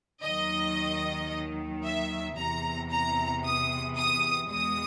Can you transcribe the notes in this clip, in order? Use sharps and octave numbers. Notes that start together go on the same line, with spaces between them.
D#2 D#3 F#3 D#5
E5
E2 C3 E3 A#5
A#5
D#6
D#6
E2 B2 G#3 D#6